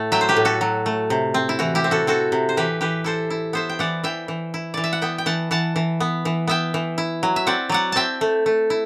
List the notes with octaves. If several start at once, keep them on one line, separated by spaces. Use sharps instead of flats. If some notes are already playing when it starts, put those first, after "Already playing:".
Already playing: A2 A3
F#3 E5 G5
C5
G4 B4
A2
F#4 A4
F#3
A3
C3
C4
E4
E3 F#4
E4 G4
C4
F#4 A4
C4 F#4 A4
C3
C5
E3 G4 B4
E3 G4 B4
E4 A4 C5
E4
B3 C5 E5
G5
E3 D5 F#5
E3 E5 G5
E3
E4
E3 D5
E5
F#5
B3 E5 G5
G5
E3 F#5 A5
E3 F#5 A5
E3
B3
E3
B3 E5 G5
E3
E4
F#3
E5
C4 D5 F#5
F#3 D5 F#5
C4 E5 G5 A5
A3
A3
E4